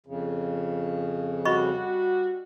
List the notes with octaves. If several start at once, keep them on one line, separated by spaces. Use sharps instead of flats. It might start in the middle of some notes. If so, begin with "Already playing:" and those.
F2 C#3
G3 F#4 D#5 B5 C#6